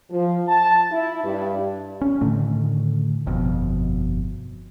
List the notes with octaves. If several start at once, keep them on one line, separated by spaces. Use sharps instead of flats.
F3
A5
E4
G2
C#4
A2 D3 D#3 A3
G1 F2 B2